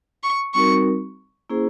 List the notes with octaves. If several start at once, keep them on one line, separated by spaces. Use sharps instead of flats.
C#6
G3 C4 D#4 F#4 A#4 C#6
A#3 C#4 E4 G#4 C5